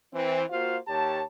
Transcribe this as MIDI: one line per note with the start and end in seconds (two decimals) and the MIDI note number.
0.13 0.43 52
0.13 0.43 60
0.50 0.77 58
0.50 0.77 65
0.50 0.77 66
0.50 0.77 72
0.50 0.77 77
0.88 1.22 39
0.88 1.22 67
0.88 1.22 73
0.88 1.22 81